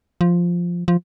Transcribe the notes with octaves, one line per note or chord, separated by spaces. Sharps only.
F3
F3